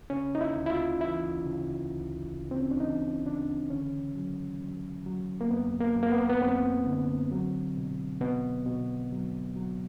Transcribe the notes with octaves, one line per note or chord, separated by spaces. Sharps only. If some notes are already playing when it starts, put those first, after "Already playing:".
C#3 C#4
D#4
E4
D2
E4
F4
E3 E4
C#3
D2
C#3
C4
C#4
D4
E3 D#4
C#3 D4
D3 C#4
F#3
F#3
F#3
A#3
F#2 B3
A#3
F#2
A#3
B3
B3
F#2 C4
D3
F#3
B2
B2 B3
B2
F#3
F#3